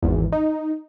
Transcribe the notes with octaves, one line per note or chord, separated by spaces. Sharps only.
G#1 E2
D#4